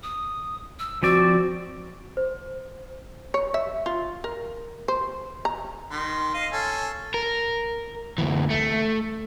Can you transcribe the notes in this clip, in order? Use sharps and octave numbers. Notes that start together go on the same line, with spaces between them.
D#6
E6
F3 C4 F#4 D5
C5
C#5
E5
F4
A#4
C5
A#5
D#3 C6
D#5 F5
C#4 A4
A#4
D2 E3
A3